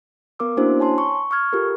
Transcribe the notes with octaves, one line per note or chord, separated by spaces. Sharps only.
B3 A#4 D6 E6
A#3 C#4 D4 E4 F#4 C5
C#5 G#5 A5 C6
C#6
C#6 E6 F6 G#6
F4 G4 A4 A#4